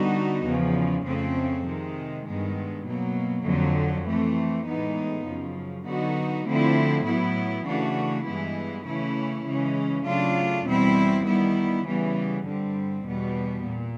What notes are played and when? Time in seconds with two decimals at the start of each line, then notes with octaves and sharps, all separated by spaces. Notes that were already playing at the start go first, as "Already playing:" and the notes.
Already playing: D3 G3 B3 D#4 F#4
0.46 E2 C#3 F3
1.06 F2 C#3 F3 A3 C4
1.66 C3 D#3 G#3
2.26 G2 D#3 G#3 B3
2.85 B2 F#3 A#3
3.46 F2 D3 F#3
4.06 E3 A3 C4
4.66 A2 E3 G#3 B3 D#4
5.26 F#2 C#3 F3
5.86 D3 F#3 B3 D#4 F#4
6.46 D3 F3 A3 C4 E4
7.06 A2 F#3 B3 E4
7.66 C#3 E3 A3 D4 F#4
8.26 G2 E3 G#3 B3 E4
8.86 C#3 E3 A3 C#4 E4
9.46 C#3 E3 G#3 C#4
10.06 C#3 F#3 A3 D4 F4
10.66 E2 B2 G3 C4 E4
11.26 D#3 G3 B3 E4
11.86 C#3 E3 G3 B3
12.46 G2 D3 G3 C4
13.06 E2 B2 G3 B3
13.66 A#2